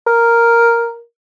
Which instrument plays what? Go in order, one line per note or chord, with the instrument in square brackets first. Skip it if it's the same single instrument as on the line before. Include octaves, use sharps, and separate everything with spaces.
[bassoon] A#4